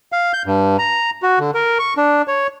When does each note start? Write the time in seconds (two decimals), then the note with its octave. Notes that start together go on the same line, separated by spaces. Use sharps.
0.12 F5
0.34 G6
0.46 G2
0.79 A#5
1.23 F#4
1.39 D3
1.54 A#4
1.79 C#6
1.97 D4
2.28 C#5